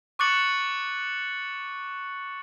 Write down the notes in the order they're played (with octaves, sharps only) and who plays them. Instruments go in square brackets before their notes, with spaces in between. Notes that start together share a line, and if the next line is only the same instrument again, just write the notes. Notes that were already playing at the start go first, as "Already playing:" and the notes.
[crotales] C#6 D6 F#6 A6 C#7 F#7